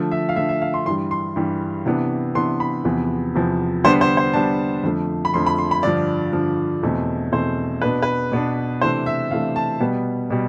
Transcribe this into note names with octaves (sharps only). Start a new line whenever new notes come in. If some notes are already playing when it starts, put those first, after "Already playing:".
Already playing: D3 F3 A3
E5
F5
D3 F3 A3 E5
E5
F5
C6
G2 E3 G3 C6
C6
G2 E3 G3
C3 E3 B3 D4
C3 E3 B3 D4 C6
B5
E2 C3 F3 B3
E2 C3 F3 B3
D3 G3 B3 D4 C5
C5
C5
D3 G3 B3 D4 A5
F2 D3 F3 A3
B5
F2 D3 F3 A3 C6
B5
C6
B5
G2 D3 F3 D5
G2 D3 F3
E2 B2 A3 C4
E2 B2 A3 C4 C5
B2 B3 D4 B4
B4
B2 B3 D4
C3 E3 A3 D4 C5
E5
C3 E3 A3 D4 F5
A5
B2 G3 B3
B2 G3